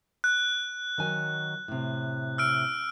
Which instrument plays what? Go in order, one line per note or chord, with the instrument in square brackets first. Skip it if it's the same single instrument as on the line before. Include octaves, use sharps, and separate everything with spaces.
[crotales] F#6
[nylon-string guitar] D#3 F#3 G#5
A2 C3
[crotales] E6 F6 D7